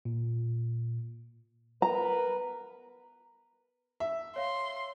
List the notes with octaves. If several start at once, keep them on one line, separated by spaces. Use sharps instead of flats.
A#2
B3 A#4 B4 A#5
E5
C#5 F5 C6